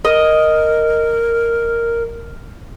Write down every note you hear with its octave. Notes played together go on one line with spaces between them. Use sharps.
A#4 D#5